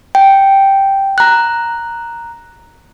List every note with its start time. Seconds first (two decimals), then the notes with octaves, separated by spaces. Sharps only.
0.15 G5
1.18 A#5 F#6